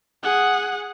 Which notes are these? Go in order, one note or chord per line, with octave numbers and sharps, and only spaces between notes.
G#4 F#5